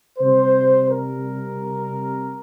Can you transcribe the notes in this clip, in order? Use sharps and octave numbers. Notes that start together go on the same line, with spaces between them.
C3 G3 C5
A#4